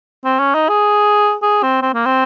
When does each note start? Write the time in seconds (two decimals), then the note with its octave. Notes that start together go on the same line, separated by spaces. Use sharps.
0.24 C4
0.39 C#4
0.54 D#4
0.69 G#4
1.42 G#4
1.63 C4
1.82 C4
1.94 A#3
2.05 C4